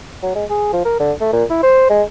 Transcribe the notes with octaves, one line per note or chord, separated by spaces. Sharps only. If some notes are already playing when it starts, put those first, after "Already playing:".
F#3
G#3
G#4
F3
A#4
D3
A3
A#2
E4
C5
G#3